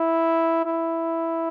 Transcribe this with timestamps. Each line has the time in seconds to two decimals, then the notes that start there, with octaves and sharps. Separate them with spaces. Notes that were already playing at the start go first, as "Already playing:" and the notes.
Already playing: E4
0.65 E4